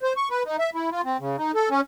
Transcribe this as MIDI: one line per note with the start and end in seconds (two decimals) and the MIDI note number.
0.03 0.13 72
0.16 0.29 85
0.30 0.43 71
0.46 0.57 63
0.59 0.70 76
0.74 0.90 64
0.92 1.01 65
1.05 1.17 60
1.20 1.36 49
1.38 1.52 63
1.55 1.69 69
1.70 1.81 61